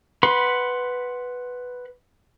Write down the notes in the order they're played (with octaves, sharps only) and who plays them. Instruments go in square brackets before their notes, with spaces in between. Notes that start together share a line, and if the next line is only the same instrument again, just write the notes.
[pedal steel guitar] B4 F#5 B5 C6